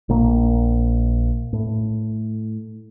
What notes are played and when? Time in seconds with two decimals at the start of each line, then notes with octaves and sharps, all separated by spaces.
0.09 A#1 A#3
1.53 A2